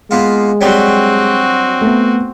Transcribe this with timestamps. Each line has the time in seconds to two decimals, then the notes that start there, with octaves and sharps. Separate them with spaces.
0.11 G#3 A#3 B3 F4
0.61 F#3 G3 C4 D4 F#4
1.81 A3 B3